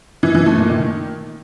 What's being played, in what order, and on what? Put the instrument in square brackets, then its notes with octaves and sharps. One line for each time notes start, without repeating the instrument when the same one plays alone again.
[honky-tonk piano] E3
E3
A3
A#2
D#3